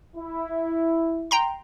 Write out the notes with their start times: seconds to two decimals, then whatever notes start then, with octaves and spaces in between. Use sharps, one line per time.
0.16 E4
1.31 G5 A#5 C6